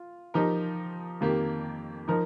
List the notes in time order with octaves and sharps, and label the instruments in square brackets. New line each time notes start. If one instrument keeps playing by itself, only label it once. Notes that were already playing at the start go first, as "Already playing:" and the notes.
Already playing: [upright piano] F4
F3 D#4 G4 A#4
F2 D#3 A#3 G4
F3 D#4 A#4